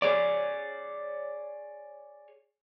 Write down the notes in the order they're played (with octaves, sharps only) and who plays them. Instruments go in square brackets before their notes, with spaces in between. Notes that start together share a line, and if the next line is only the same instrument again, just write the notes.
[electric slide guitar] G#4 C#5 D5